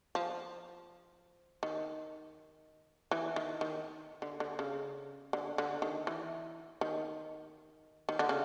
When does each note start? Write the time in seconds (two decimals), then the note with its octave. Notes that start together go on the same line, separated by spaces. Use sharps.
0.15 F3
1.63 D#3
3.11 E3
3.36 D#3
3.61 D#3
4.22 D3
4.40 D3
4.59 C#3
5.33 D3
5.58 D3
5.82 D#3
6.07 E3
6.81 D#3
8.09 D#3
8.19 D3
8.29 C#3